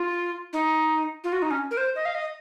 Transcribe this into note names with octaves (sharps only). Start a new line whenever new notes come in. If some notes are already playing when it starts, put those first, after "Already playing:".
Already playing: F4
D#4
F4
F#4
D#4
C#4
A#4
C5
D#5
F5
D#5